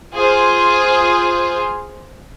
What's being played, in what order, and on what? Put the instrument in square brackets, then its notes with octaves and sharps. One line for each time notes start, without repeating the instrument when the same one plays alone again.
[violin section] F4 G#4 C5